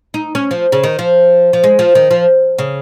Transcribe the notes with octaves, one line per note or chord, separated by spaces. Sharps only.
D#4
C#4
F3
C#3
D#3
F3
F3
G#3
F3
D#3
F3
C#3